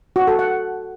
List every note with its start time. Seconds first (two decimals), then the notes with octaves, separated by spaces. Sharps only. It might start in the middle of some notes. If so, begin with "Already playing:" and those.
0.16 F#4
0.27 A4
0.39 F#5